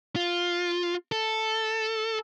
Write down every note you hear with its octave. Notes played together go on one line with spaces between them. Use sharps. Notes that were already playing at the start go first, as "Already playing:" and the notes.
F4
A4